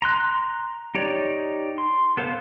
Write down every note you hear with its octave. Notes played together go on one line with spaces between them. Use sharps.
A#5 C6 F#6
D#4 G4 C#5 D5
C6
B3 A4 C5 F5